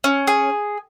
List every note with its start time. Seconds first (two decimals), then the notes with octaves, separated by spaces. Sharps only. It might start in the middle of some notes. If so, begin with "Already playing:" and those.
0.04 C#4
0.27 G#4